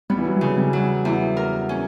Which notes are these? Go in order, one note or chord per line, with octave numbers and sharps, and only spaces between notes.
G3 B3
E3
F#3
G3
C#3 F#3
G3
F#3
E2
A#4
C#4